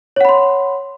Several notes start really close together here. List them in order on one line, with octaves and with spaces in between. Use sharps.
C#5 F#5 B5 C6